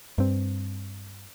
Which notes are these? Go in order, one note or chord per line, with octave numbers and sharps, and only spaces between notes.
G2 C4